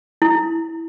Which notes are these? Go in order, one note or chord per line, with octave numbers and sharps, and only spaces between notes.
E4